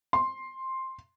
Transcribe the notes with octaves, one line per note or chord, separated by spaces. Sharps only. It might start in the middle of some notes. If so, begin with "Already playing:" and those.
C6